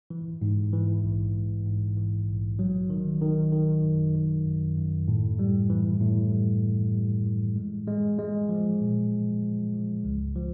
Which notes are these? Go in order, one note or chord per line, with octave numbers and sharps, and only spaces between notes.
E3
G#2
E3
A#1
G#2
G#2
E3
A#1
F#3
D#3
D#3
D#3
F#2
D#3
F#2
F#2
A2
G3
E3
A2
G3
E3
G3
E3
G#3
G#3
G#3
F3
A#2
F3
F3
F3
C#2
F3